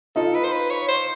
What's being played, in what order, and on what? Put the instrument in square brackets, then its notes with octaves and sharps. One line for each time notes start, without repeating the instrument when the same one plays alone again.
[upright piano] D#4 F4 [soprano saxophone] A4
[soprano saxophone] B4
C5
B4
C#5
C5